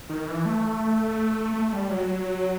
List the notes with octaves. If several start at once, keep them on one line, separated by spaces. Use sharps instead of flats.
D#3
E3
A3
A3
G3
F#3